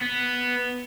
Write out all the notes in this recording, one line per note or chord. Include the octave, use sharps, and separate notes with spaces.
B3